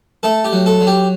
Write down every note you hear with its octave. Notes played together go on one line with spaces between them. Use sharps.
A3 A4
G4
F#3
A4
F#3
G4